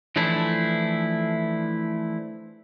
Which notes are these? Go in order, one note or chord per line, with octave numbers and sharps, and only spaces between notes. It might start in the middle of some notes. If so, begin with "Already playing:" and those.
E3 F3 A3 D4 E4